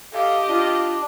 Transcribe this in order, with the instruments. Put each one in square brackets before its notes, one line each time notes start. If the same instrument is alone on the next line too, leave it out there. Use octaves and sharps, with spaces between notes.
[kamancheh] G4 D#5 [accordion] A4 [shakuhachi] F5
[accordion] D4 [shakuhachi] F4